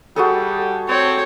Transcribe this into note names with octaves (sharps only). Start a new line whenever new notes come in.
G3 F#4 G#4 A4
C4 C#5